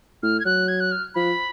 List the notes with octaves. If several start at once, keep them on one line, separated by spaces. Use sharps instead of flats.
A2 F6
G#6
F#3 F#6
G#6
F#6
F6
F3 B5